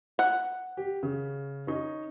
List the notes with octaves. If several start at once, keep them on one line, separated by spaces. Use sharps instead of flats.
F#5
G4
C#3
C#4 D#4